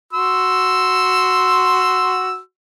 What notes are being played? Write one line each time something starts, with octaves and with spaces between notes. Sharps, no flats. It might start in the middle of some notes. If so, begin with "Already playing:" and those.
F#4 C6 E6